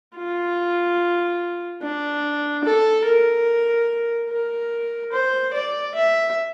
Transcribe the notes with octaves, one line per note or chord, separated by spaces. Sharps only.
F4
D4
A4
A#4
A#4
C5
D5
E5